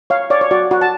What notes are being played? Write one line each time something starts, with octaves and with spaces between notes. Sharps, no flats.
C#5 F5
C#5 D5
C#5
F#4 D5
F#4
A5